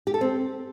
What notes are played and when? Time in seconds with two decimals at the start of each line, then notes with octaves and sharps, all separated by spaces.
0.07 G4
0.14 A4
0.21 C4